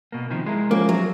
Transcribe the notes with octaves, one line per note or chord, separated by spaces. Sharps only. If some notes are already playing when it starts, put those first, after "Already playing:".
B2 A#3
C3 D#3 F3
G#3 E4 A#4
F3 A#3 C#4
F#3